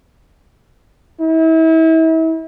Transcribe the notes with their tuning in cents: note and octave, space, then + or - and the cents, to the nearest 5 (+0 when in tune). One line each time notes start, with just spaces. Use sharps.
E4 -35